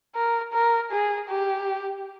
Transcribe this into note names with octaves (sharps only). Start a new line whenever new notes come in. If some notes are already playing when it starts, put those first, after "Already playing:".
A#4
A#4
G#4
G4